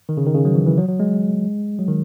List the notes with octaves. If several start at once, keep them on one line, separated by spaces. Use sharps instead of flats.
D#3
C#3
D#3
C#3
F#3
E3
E3
F#3
F#3
G#3
F#3
D#3